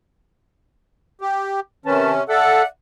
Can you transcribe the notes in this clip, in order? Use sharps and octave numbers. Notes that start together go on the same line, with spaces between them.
G4
C3 D#3 C#4 B4 A5
A4 D5 E5 F#5